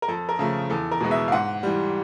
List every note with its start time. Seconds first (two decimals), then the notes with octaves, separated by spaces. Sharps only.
0.02 A#4
0.08 F2 A4
0.29 A#4
0.39 C#3 F3 A3
0.70 E2 A4
0.91 A#4
1.01 B2 G#3 B3
1.11 E5
1.28 F5
1.32 G#2 F#5
1.63 E3 G3